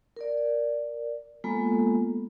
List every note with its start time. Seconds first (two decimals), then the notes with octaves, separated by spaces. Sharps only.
0.16 A#4 D5
1.44 G#3 A#3 B3 F4 A4